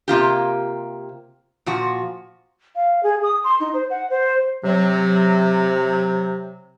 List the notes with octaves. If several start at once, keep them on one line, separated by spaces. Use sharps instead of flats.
C3 A#3 F4 G4
A#2 F3 F#4
F5
G#4
D#6
C6
D#4
C5
F#5
C5
C3 F#3